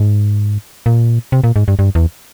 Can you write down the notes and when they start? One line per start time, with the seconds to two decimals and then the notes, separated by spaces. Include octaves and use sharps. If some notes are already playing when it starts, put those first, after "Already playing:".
Already playing: G#2
0.86 A#2
1.32 C3
1.44 A#2
1.56 G#2
1.68 G2
1.79 G2
1.95 E2